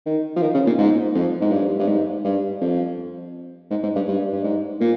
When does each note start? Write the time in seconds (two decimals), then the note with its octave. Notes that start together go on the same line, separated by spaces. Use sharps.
0.06 D#3
0.36 F3
0.42 D#3
0.54 C#3
0.67 A#2
0.78 G#2
1.15 F2
1.42 G#2
1.52 G2
1.79 G2
1.88 G#2
2.25 G2
2.61 F2
3.70 G#2
3.83 G#2
3.95 G2
4.08 G2
4.32 G2
4.44 G#2
4.80 A#2